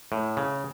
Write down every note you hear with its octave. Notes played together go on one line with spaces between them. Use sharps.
A2
C#3